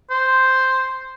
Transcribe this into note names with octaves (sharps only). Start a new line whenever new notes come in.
C5